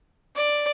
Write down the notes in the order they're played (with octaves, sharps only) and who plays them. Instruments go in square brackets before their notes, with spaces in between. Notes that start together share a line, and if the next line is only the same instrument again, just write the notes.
[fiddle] D5